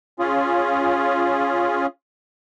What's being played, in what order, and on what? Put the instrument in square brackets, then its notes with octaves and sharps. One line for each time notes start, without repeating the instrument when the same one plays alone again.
[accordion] C#4 F4 G#4